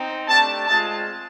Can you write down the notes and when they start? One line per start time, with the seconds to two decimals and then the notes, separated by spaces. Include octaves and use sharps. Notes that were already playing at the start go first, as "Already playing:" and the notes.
Already playing: C4 D#4
0.26 A3 D4 G4 A5
0.66 G#3 C4 F4 A5